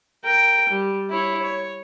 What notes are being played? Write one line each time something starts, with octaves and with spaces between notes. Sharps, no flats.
A#4 G5
G3
E4 C#5
C#5